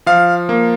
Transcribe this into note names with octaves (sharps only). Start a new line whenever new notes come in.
F3 F5
A#3